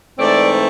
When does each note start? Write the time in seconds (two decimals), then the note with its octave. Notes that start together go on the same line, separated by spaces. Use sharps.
0.18 G#2 E3 A3 C4 D5